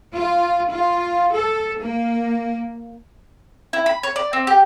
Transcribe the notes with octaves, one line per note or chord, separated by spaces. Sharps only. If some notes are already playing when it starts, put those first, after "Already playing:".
F4
F4
A4
A#3
E4
B5
C#5
D5
C4
G4